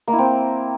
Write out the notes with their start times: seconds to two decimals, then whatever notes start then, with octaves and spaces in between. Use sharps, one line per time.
0.07 A#3
0.13 E4
0.18 C4